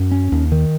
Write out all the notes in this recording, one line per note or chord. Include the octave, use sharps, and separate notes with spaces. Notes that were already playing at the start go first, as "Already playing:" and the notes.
Already playing: F#2
C#4
D#2
D#3